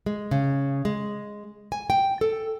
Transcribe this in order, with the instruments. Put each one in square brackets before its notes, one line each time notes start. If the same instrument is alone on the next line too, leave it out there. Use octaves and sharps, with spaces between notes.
[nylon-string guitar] G#3
C#3
G#3
G#5
G5
A4